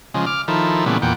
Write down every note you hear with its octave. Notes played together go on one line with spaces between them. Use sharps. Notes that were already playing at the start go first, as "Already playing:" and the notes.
C#3 F3 G#3
D6 F6
D#3 F3 E4 A4
A#2 C#3 E3 G3 A3 B3
E2 A#2 F#5 G5